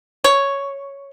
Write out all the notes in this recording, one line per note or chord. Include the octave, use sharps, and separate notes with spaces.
C#5